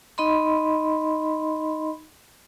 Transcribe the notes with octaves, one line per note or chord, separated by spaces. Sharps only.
D#4 D#5 B5 C6